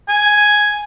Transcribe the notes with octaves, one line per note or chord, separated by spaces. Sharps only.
G#5